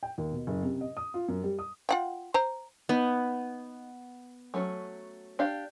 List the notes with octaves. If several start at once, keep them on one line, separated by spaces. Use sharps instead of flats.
G5
D#2
B2
F#1
C3
D#5
D#6
F4
F#2
G3
D#6
F4 F#5 G5
C5 A#5
B3 D#4
F#3 A3 C#4
D4 G4 F5